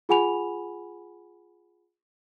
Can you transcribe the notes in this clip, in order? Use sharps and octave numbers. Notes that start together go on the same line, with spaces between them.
F4 G#4 F#5 G#5 B5 F7